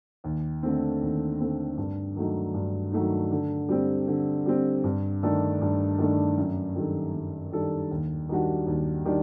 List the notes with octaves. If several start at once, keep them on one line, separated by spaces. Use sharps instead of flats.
D#2
D3 A3 C4
D#2
D3 A3 C4
G2
D#3 F#3 A3 D#4
G2
D#3 F#3 A3 D#4
D3
G3 C4
D3
G3 C4
G2
D#3 A3 D4 A4
G2
D#3 A3 D4 A4
F#2
D#3 G3 D4 A4
F#2
D#3 G3 D4 A4
D#2
D#3 G3 D4 F#4
D#2
D#3 G3 D4